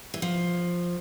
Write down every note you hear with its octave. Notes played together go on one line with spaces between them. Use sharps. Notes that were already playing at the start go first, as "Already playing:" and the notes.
E3
F3